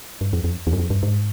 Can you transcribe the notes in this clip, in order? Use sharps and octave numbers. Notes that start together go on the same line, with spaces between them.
G2
F2
F2
E2
F#2
F2
G2
G#2